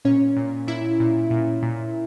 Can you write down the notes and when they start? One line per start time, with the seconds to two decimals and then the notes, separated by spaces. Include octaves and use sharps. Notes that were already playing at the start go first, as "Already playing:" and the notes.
0.05 A#2 C#4 C#5
0.37 A#2
0.67 A#2 E4 E5
1.00 A#2
1.30 A#2
1.62 A#2